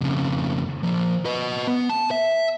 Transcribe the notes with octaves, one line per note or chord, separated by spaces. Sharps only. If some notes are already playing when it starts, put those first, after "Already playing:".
F2 C#3
F3 A#3
B4 D#5
B3
A5
E5